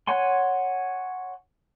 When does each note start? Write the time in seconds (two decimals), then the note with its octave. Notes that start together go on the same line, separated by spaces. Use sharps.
0.07 C#5 F#5 G#5 C6